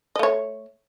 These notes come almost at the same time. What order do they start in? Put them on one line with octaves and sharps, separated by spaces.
D#5 A3 C#5